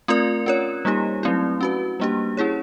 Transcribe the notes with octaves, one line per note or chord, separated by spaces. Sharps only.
A3 C4 F4 A#4 D5
C#4 F4 A#4 C#5
G3 A#3 D#4 G4
F#3 A3 C4 E4
C#4 F#4 B4
G3 A#3 D4 G4
C#4 E4 G#4 C#5